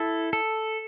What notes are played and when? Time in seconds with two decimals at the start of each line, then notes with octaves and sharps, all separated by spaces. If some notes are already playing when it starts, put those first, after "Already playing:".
Already playing: E4 A4
0.33 A4